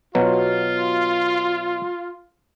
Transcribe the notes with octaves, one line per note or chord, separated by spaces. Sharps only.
B2 F#3 F4